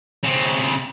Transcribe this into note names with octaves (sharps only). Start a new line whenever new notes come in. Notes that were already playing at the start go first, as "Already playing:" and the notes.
C#3 C4